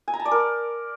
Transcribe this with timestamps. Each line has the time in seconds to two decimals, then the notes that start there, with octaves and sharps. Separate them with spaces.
0.08 G#5
0.14 A#5
0.19 A5
0.25 D5
0.31 A#4